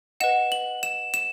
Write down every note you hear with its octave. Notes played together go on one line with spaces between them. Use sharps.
B4 D#5 F#5 E7
F#7
E7
E7